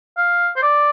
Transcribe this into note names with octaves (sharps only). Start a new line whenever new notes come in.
F5
C5
D5